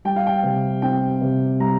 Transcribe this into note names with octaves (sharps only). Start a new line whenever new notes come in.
G3 G5
F5
G5
C3
C4 G5
C3
G3 A#5